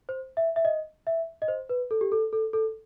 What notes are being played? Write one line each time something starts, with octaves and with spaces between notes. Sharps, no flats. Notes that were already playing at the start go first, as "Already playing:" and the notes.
C5
E5
E5
D#5
E5
D#5
C5
B4
A4
G4
A4
A4
A4